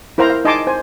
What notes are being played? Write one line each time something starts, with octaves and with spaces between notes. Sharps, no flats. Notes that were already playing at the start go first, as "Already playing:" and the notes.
E4 A#4 C5 F5 A#5
F5
D#4 D#5 G#5 A5 C6 D6
C5 G#5